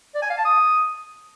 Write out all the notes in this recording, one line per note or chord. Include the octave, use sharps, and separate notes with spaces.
D5
G#5
F5
A5
D#6